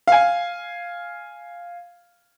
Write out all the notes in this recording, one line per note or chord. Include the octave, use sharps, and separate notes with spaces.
F5 G#5